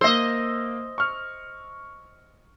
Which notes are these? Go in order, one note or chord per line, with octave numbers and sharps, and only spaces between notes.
A#3 C5 D#5 E6
C#6 F6